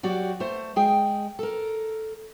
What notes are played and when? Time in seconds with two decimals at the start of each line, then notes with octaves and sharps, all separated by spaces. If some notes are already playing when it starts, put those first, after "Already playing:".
0.03 F#3 F#4 G4 D5
0.40 A3 C5
0.76 G#3 G#4 G5
1.39 A4 A#4